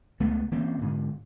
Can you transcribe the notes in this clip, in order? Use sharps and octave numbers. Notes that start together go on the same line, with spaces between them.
C#2 A3 B3
E3 A#3 C4 C#4
G#2 D3